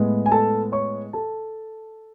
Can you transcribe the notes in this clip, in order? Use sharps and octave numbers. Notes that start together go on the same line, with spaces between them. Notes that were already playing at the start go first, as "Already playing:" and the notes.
Already playing: A2 G#3 B3
G#5
A4 A5
C#5 C#6
A4 A5